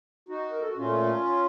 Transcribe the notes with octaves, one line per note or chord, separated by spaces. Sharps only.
D#4 F#4
A#4
A4
F#4
A#2 A3 C#4 F4